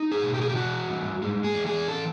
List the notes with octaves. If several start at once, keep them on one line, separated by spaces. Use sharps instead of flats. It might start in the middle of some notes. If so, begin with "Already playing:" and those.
Already playing: D#4
G#4
B2
G4
G#4
G4
E3 F#4
G2
G#3
G#4
E3
G#4
A4